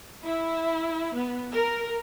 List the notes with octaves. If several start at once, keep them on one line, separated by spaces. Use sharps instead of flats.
E4
B3
A#4